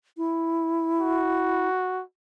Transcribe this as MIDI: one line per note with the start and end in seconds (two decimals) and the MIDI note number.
0.18 1.68 64
1.01 2.02 66